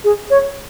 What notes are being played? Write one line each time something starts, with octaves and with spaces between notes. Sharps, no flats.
G#4
C#5